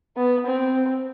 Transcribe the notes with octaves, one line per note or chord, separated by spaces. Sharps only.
B3
C4